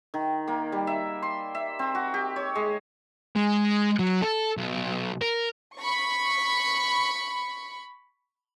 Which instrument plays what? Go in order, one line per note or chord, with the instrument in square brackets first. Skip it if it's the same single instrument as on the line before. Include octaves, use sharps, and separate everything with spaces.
[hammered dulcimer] D#3
A#3
G3
E5
C6
E5
C4
F#4
G4
C#5
G#3
[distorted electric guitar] G#3
F#3
A4
B1
A#4
[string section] B5 C#6